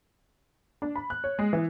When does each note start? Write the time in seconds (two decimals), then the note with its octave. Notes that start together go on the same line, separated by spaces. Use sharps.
0.82 D4
0.96 B5
1.10 F#6
1.24 C#5
1.39 G#3
1.53 E3